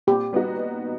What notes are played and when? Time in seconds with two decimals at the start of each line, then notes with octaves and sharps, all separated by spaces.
0.07 A#2 G4
0.33 G3 B3 D#4 F#4